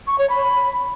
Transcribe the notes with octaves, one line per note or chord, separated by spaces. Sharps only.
C#6
C#5
B5